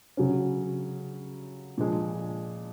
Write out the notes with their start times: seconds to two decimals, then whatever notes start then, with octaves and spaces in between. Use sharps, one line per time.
0.17 C#3 F#3 C#4
1.78 A#2 F3 G#3